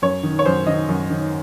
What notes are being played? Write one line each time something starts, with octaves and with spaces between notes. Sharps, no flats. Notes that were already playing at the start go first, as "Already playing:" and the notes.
F#2 C#5
D#3
C#5
F#2 C5
D#3 D#5
F#2
D#3